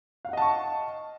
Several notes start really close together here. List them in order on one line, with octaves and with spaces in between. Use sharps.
F5 F#5 D#5 A5 C#6